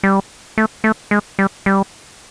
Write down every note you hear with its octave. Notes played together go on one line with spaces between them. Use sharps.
G3
A3
A3
G#3
G3
G3